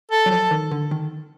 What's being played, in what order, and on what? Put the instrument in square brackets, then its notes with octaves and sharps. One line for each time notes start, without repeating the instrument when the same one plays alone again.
[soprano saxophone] A4
[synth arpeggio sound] F#3
[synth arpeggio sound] F3 [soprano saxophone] A4
[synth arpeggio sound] D#3
D3
D#3